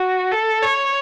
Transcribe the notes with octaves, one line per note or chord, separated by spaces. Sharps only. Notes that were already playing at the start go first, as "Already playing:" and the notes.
Already playing: F#4
A4
C#5